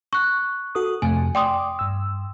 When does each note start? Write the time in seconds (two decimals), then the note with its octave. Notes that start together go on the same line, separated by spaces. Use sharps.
0.13 C#6 F#6
0.75 F#4 A4 D#6
1.02 F2 C3 A3 G#5
1.35 D5 G5 C6 D6 D#6
1.79 G2 E6